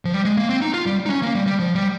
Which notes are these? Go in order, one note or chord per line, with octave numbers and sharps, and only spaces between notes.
F3
G3
G#3
A#3
C4
D#4
F4
G3
D#4
C#4
A#3
G3
G3
F3
G3